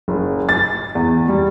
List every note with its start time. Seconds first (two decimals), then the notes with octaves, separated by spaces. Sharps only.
0.08 F#1
0.49 A6
0.95 E2
1.28 G3